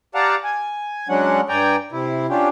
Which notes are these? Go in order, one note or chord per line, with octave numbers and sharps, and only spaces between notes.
G4 D5 F5 F#5 A5 A#5
G#5
F#3 G#3 C#4 D4 F#5
G2 D5 G5 G#5 A#5
C3 E4
C#4 D4 F4 G4